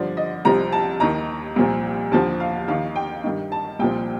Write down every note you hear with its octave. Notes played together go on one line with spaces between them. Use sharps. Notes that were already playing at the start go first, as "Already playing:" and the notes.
Already playing: G2 D3 F3 D5
D#5
C2 C3 F3 A#5
A5
D#2 D#3 A#5
C2 A#2 F3
D#2 D3 F3 A5
F5
D#2 D#3 F5
G5
G2 D#3
A5
C2 A#2 F3 G5